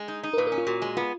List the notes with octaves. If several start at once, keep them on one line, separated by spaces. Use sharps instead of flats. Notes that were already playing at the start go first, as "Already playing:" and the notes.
Already playing: G#3
D#4
D#4
A#4
A#2 B4
A#4
C#4
F4
A#2 F#4
G#3
B3 F4